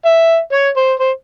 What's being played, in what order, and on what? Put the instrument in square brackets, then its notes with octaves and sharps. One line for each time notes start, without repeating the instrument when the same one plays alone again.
[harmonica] E5
C#5
C5
C5